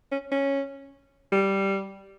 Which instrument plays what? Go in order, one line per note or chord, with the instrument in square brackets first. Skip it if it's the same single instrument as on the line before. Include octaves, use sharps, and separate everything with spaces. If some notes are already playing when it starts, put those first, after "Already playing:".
[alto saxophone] C#4
C#4
G3